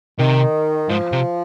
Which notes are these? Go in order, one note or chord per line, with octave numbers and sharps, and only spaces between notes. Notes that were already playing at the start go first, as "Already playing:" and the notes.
C3 D#3
G#2 F3
C3